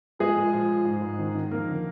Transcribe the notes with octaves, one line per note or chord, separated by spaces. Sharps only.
F3 G#3 G#4
A#2
F3
F3
G#2
G#2
D#3
D#3
F2 A#3 A#4
D3